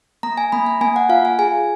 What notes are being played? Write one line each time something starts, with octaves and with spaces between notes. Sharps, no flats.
A#3 A#5
G#5
A#3 B5
A#5
A#3 G#5
F#5
F4 F5
G#5
G#4 G#5